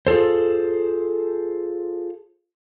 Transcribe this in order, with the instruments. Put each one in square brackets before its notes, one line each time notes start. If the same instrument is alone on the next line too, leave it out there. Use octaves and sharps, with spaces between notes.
[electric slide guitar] F4 G#4 A4 C5